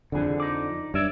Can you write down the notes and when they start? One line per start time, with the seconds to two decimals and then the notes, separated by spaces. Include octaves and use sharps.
0.12 C2 F2 D3 E3 G#4
0.40 D#4 D5
0.94 G2 C#5 D5 E5